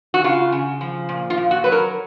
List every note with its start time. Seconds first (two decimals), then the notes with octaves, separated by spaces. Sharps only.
0.14 F#4
0.24 C#3 F4
0.52 C#3
0.81 F3
1.09 A#2
1.30 F4
1.37 A#2
1.51 F#4
1.64 F#3 B4
1.72 A#4